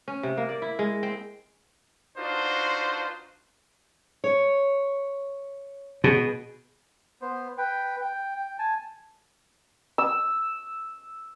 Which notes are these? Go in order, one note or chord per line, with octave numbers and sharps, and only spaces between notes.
C#4
C3
A#3
D5
E4
G#3
C4
D4 D#4 F4 F#4 B4 C5
C#5
B2 G#4
B3 C5
B4 G5
G5
G5
G#5 A5
E6